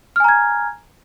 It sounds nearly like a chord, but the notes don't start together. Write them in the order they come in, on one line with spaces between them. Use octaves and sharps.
F6 G#5 A#5 G#6